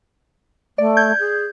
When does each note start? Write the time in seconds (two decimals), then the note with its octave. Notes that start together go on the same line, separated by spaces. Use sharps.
0.78 A3 D5
0.97 G6 G#6
1.20 G#4